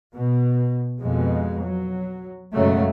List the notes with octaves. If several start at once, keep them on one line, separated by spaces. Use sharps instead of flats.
B2
F2 B2 G#3
F#3
B1 F#2 C#3 F#3 G#3 A3